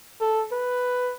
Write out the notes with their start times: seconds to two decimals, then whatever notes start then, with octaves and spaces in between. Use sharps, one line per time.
0.21 A4
0.52 B4